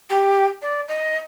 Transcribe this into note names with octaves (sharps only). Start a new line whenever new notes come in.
G4
D5
D#5